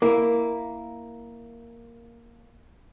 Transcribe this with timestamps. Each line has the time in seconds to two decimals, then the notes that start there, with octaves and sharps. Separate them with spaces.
0.02 A#3 E4